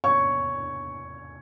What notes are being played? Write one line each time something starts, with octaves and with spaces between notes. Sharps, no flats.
C#5 C#6